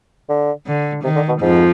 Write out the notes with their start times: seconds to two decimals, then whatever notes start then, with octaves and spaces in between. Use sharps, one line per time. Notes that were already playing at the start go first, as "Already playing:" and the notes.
0.29 D3
0.66 D3
1.04 C3 D#3
1.16 D3
1.28 B2
1.41 F2 G#2 F3